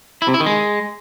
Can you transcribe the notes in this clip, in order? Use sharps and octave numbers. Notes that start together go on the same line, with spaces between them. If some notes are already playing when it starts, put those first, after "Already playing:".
E4
C3
E4
D#3
G#3